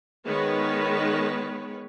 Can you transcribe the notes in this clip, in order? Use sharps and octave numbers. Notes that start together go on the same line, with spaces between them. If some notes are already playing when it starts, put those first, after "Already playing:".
D#3 G#3 B3 B4 C#5